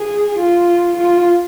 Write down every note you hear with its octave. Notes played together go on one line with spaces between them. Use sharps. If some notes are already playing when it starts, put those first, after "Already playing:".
Already playing: G#4
F4
F4